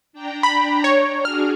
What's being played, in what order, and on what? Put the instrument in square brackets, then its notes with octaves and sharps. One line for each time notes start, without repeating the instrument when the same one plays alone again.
[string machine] D4 G5 A#5
[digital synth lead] B5
C#5
[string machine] D4 F#4 G#4 [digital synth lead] F6